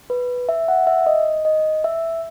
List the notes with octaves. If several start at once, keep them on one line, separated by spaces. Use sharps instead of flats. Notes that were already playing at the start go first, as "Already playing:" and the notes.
B4
E5
F#5
E5
D#5
D#5
E5